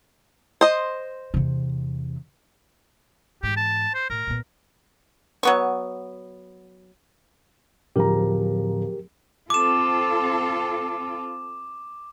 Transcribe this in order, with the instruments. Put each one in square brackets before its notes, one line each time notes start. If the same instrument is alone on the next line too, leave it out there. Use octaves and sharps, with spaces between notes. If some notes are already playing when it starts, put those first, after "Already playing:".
[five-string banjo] C5 D#5
[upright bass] E2 C3
[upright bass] G#2 E3 [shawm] G4
[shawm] A5
C5
[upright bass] A2 [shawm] A#4
[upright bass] A#2 B3
[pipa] F#3 B3 C#6
[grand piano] D1 F3 A#5 [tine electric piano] G4 A#4
[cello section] C4 F4 A4 [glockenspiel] D6 E7